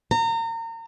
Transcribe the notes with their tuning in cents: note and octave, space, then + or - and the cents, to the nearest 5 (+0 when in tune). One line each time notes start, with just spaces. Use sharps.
A#5 -35